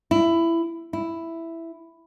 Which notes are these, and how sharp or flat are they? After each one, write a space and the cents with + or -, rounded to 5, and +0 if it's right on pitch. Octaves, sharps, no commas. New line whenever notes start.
E4 +15
E4 +5